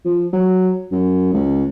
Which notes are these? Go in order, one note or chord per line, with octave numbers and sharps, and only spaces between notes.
F3
F#3
F#2
C#2